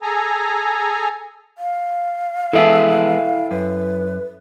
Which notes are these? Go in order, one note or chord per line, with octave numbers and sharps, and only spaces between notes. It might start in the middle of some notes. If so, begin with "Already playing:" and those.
G#4 A4 G#5 A#5
F5
E3 G#3 B3 E4 A4 E5 G5 G#5
F#2 B4